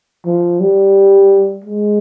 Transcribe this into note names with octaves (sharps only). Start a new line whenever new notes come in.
F3
G3
G#3